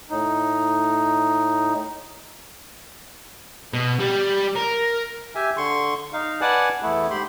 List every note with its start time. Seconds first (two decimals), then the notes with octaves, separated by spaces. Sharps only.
0.10 A2 D#4
3.73 B2
3.99 G3
4.56 A#4
5.35 G4 E5 G#5
5.57 D3 C6 C#6
6.13 D#4 F5
6.41 B4 D5 F#5 G#5 A5
6.82 E2 A3 B3 E4
7.10 G#2 G4 B5 C6